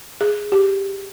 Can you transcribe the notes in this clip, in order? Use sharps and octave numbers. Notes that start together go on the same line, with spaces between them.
G#4
G4